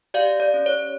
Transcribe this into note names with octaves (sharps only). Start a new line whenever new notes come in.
G4 D5 F5
D5
C#4
C#5